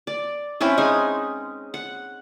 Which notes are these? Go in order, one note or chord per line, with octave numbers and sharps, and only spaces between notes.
D5
C4 C#4 E4 B4
G#3 D#4 G#5
F#5